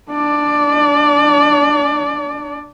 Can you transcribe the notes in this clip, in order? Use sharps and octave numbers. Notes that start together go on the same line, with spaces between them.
D4 D5